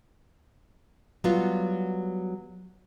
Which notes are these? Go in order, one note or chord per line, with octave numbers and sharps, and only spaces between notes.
F#3 G3 B3 F4